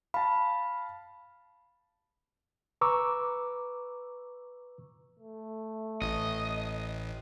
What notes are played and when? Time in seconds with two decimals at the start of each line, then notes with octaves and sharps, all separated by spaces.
0.14 F5 A5 B5
2.81 B4 A#5 C#6 D6 E6
5.19 A3
6.02 A1 D#5